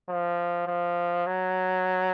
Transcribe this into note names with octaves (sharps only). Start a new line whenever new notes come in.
F3
F3
F#3